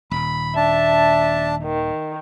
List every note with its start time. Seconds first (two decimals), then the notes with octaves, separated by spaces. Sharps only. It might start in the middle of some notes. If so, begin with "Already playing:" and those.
0.11 D#1 B5
0.56 D4 E5 A5
1.63 D#3